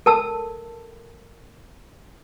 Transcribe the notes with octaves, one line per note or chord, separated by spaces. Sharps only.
A4 A#4 A5 E6